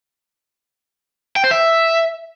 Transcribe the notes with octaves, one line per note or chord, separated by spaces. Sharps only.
G5
C5
E5